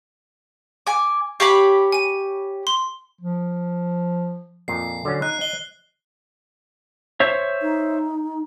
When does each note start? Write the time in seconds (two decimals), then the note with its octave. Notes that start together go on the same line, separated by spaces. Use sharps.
0.87 G#5 D6
1.40 G4 C#5 F5 B5 C#6 D6
1.92 G#5 D#7
2.67 C6
3.21 F3
4.68 F2 A#2 C7
5.05 D3 F#3 C#4
5.22 D#4 F#6
5.41 D#5 G7
7.20 C5 C#5 E5
7.62 D#4